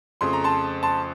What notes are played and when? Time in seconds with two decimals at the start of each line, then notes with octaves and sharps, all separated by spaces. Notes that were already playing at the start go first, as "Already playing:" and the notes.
0.21 F2 C#3 A3 C6
0.33 A#5
0.44 A5 C6
0.83 A5 C6